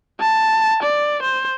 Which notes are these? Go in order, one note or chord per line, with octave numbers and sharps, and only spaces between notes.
A5
D5
C5